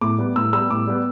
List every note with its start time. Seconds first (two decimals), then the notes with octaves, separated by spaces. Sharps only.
0.01 A2 D6
0.18 G3 B3
0.36 A2 E6
0.53 G3 B3 E6
0.70 A2 D6
0.87 G3 B3